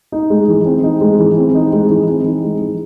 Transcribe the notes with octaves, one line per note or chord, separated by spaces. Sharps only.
D#4
G#3
E3
C4
D#4
G#3
E3
C4
D#4
G#3
E3
C4
D#4
G#3
E3